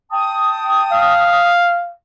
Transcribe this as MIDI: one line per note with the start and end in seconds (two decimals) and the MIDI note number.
0.12 1.50 79
0.12 1.50 81
0.12 1.50 87
0.92 1.92 77